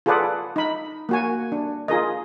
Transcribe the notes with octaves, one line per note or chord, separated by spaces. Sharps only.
F4 G#4 A4 B4 D5 F#5
D#4 B5
A#3 F#4 G#5
D4
F4 G#4 A#4 D#5